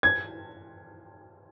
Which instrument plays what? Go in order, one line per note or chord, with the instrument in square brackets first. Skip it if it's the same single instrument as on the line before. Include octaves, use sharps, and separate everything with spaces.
[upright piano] G#6